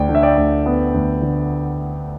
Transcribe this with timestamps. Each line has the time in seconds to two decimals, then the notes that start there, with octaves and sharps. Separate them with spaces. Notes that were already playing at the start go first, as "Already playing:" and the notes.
Already playing: D2 D5 G5
0.09 D3
0.15 E5
0.23 D5 G5
0.37 D2
0.66 B3
0.94 D2
1.22 D3